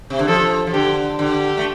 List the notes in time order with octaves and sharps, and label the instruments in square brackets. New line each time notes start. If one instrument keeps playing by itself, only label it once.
[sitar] C3
D3
[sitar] F3 [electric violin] A4
[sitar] F3
[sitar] D3 [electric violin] G4
[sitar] D3 [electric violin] G4
[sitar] A3